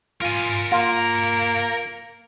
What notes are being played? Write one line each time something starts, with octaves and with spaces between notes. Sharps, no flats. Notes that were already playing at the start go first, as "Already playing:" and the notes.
F4 A#4 G#5
A#3 F4